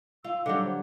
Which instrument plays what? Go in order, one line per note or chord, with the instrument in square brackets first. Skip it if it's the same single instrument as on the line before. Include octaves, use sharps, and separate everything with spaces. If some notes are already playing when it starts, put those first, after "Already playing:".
[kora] F4 [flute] E6
[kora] D3 F#3 G3 [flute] D6
[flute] C5